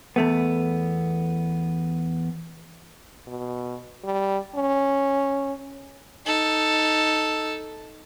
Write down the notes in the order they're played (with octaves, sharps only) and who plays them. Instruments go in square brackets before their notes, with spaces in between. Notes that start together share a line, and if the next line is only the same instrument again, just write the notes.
[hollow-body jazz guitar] E2 A3 B3
[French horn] B2
G3
C#4
[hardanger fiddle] D#4 A4